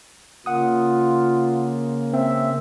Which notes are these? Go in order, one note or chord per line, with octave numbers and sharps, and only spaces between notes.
C#3 A#3 F4 F#5 D#6
C4 E5